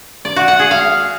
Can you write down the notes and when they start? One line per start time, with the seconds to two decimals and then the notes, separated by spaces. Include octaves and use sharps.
0.25 D5
0.36 F#4
0.48 F#5
0.59 G#4
0.71 F5